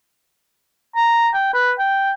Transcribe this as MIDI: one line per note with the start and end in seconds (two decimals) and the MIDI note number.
0.96 1.28 82
1.34 1.53 79
1.54 1.72 71
1.79 2.12 79